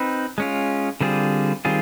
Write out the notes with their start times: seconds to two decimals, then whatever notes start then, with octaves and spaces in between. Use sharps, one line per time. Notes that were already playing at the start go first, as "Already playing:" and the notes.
Already playing: C4 D#4 B4
0.38 G#3 C#4 F4
1.01 D3 G3 C4 F4 G#4
1.65 D#3 G3 C4 F4 G#4